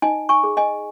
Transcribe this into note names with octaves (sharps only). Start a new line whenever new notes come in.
D#4 D#5 G#5
G#5 C#6
G#4
D#5 G#5